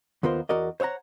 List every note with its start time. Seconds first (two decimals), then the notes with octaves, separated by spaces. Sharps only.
0.23 D#2 B3 F4 A#4 C5
0.49 E2 F#4 A#4 D5 D#5
0.80 C5 C#5 E5 F#5 A#5